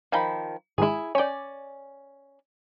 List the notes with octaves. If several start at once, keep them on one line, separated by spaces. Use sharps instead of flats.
D#3 F3 F5 G#5 B5 G6
G#2 D#3 G#3 E4 G#4
C#4 C#5 D5 G5